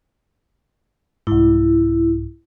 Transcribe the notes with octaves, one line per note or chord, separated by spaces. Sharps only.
C2 G#2 E4